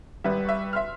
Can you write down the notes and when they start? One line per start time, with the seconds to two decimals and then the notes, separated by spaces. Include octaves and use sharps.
0.24 G#1 G3 B4 E5
0.45 E5 C#6
0.73 E5 C6 F6